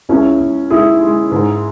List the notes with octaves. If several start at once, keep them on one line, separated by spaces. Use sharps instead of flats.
C#2 C#4 E4
C#2
G#3 E4 G#4
G#3
G#2